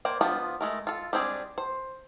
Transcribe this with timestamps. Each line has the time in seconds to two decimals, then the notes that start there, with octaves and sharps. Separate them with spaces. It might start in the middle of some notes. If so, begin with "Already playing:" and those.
0.05 A#3 C5 D5
0.21 F3 B3 D4 F4
0.61 G#3 A3 A#4
0.87 F4 A4
1.13 G3 C4 D4 G#4
1.58 C5